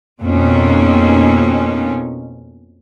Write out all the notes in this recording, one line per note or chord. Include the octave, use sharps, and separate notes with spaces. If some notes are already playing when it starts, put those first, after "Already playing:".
F2 B2 A#3 C#4 D#4